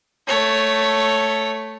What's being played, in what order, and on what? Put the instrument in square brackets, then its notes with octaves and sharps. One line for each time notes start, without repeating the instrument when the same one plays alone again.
[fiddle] A3 C#5